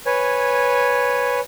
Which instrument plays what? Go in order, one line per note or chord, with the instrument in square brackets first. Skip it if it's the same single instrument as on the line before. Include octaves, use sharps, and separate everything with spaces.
[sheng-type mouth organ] B4 C#5 G#5